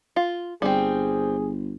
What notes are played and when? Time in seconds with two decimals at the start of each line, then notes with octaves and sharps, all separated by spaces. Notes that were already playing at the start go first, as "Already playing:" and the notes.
0.16 F4
0.62 G1 G3 C4 G#4